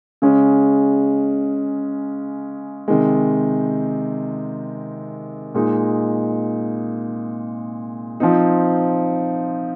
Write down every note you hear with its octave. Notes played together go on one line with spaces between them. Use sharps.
C#3 G#3 C#4
C3 D#3 G#3
A#2 G#3 D#4
F3 C4 D#4